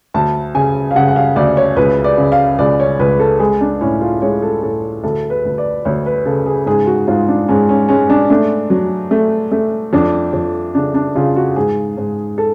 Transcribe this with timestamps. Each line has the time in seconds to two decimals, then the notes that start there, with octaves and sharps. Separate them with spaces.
0.14 D2 A5
0.55 C#3 G#5
0.91 F5
0.96 C#3 F#5
1.08 F#5
1.16 F5
1.36 D2 D5
1.57 C#5
1.77 C#2 B4
2.04 D5
2.18 C#3
2.32 F5
2.59 C#2 D5
2.80 C#5
2.99 C#2 B4
3.19 A4
3.40 G#3 G#4
3.61 D4
3.81 A2 C#4
4.01 F4
4.22 G#3 C#5
4.42 A4
4.63 A2 A4
5.03 D2 A4
5.30 B4
5.45 D2
5.58 D5
5.85 D2 C#5
6.06 B4
6.26 C#3 A4
6.46 G#4
6.66 G#2 G#4
6.87 F#4
7.08 G#2 F4
7.28 D4
7.48 G#2 C#4
7.69 C#4
7.88 G#3 C#4
8.10 D4
8.30 A3 D4
8.70 F#3
9.11 A3
9.52 A3
9.93 F2 D4
10.33 F2
10.75 C#3 D4
10.94 D4
11.15 C#3 F4
11.36 F#4
11.56 G#2 G#4
11.97 G#2
12.38 A4